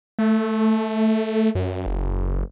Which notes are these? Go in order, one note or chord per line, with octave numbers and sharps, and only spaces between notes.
A3
F#2
F#1